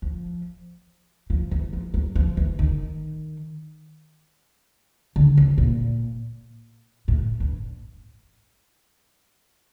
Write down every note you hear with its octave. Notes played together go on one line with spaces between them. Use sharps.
F3
F3
E3
F3
F#3
F3
E3
D#3
D3
C#3
A#2
A2
G2